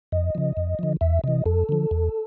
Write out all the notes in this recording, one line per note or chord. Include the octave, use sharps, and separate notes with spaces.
F2 D#5
C#3 F3
F2
D3 F3
E2 E5
C3 E3 D#5
F2 A4
D3 F3
E2